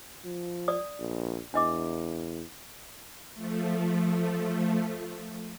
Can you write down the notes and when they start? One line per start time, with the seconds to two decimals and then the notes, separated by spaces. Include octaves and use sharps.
0.25 F3
0.68 D5 D#6
1.00 A#1
1.54 E2 D4 D#5 D6
3.34 F3 A3